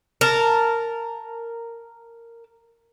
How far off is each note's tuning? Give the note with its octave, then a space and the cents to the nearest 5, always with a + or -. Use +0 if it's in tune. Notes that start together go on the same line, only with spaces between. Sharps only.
A#4 -10 A5 +0